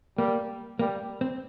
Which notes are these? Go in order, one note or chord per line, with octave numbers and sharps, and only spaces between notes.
G3 A#3
G3 A#3
C4